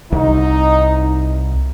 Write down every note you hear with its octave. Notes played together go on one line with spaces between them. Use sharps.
C2 D#4